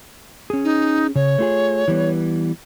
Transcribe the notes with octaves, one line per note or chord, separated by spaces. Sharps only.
C#4 G#4
D#4
C#3 C#5
A3 F4 G#4
E3 G3 B3